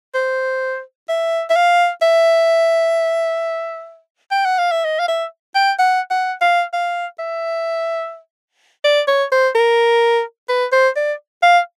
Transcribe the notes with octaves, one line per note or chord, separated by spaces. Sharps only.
C5
E5
E5
F5
E5
G5
F#5
F5
E5
D#5
F5
E5
G5
F#5
F#5
F5
F5
E5
D5
C#5
C5
A#4
B4
C5
D5
F5